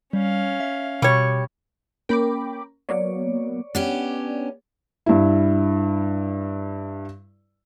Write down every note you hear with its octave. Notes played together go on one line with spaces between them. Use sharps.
G3 C#4 F5
E5
B2 G3 C#5
A#3 C#4 A#4 G5 B5 D6
F#3 A#3 B3 C#5 D5
B3 C#4 D4 G4
G2 E4